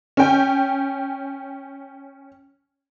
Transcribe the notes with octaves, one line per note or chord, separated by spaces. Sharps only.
C#4 G5